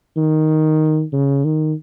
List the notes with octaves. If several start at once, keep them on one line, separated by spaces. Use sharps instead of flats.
D#3
C#3
D#3